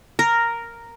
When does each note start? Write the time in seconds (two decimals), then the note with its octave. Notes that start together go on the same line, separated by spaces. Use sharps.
0.19 A#4